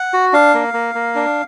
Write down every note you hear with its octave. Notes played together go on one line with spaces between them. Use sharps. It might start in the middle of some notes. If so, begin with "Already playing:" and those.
Already playing: F#5
F#4
D4 F5
A#3
A#3
A#3
D4